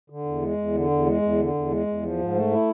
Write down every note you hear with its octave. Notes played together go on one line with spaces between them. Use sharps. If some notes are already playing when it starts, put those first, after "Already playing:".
D3
E2
G#3
E2
D3
E2
G#3
E2
D3
E2
G#3
E2
F3
G#2
A3
E4